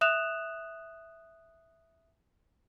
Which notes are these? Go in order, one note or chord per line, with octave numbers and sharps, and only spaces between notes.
E5 D#6 F#6 E7 F7